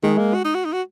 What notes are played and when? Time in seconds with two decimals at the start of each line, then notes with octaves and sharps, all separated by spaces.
0.03 D#3 G#3
0.18 A#3
0.34 F#4
0.45 D#4
0.55 F#4
0.65 D#4
0.73 F#4